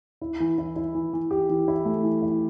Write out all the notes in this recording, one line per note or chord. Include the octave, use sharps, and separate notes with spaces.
E4
E3
E4
E4
E3
E3
G4
E3
E4
A3
E3
E4